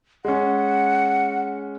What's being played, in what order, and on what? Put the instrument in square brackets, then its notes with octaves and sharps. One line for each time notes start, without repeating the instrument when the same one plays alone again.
[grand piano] G#3 C#4 [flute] F#5